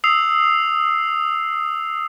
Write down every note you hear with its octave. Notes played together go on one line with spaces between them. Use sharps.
D#6 E6 C7 F7